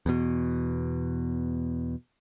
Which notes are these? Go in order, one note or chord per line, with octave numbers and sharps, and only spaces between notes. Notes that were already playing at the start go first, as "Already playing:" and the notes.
E2 B2